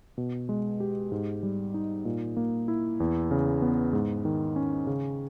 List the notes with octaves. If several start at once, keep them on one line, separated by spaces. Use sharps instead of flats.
B2
G#3
G4
G#2
G3
D#4
A#2
A#3
E4
E2
C#3
B3
G#2
D#3
C#4
C#3